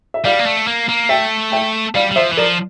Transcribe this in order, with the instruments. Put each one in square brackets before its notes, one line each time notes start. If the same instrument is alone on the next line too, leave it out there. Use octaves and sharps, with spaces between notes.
[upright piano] E5
[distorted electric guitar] G3 [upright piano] D5 F5
[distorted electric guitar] A#3
A3
A#3
A#3
[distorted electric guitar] A3 [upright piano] E5 G5
[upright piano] E5 G5
[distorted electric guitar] G3 [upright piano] D5 F5
[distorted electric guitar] G3
[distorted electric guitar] F3 [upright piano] C5 E5
[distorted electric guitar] E3
[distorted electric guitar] F3 [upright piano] A#4 D5